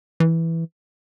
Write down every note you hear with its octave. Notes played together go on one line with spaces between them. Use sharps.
E3